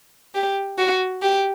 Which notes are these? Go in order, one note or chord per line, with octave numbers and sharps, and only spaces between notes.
G4
F#4
G4